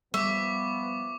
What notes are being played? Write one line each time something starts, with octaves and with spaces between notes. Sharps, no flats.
F3 G3 B3 E5 C#6 D6